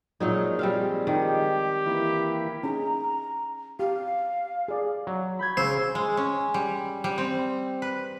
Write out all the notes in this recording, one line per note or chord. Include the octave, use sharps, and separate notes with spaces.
A#2 F3 F#3 G#3 D#4
G3 C4 F5
D#3 G4
E3 A#3 E4
C#4 D#4 G#4 A#5
G4 F5
G#4 D5
F#3
B5 G6 G#6
C#3 C5 E6
G#3
C#4
G3
G3
C4
B4